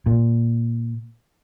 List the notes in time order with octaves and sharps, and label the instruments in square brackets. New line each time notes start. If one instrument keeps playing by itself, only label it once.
[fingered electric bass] A#2